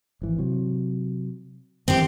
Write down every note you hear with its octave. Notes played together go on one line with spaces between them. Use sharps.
G#1 E3
C3 F#3
A1 E3 G#3 C4 G4